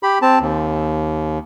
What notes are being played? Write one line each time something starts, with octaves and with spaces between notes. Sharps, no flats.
G4 B5
C4 A5
D#2